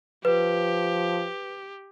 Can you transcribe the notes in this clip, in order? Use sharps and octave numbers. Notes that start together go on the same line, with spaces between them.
F3 G4 B4